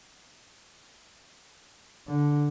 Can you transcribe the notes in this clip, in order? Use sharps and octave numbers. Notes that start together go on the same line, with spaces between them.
D3